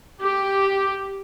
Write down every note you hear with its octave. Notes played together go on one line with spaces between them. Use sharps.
G4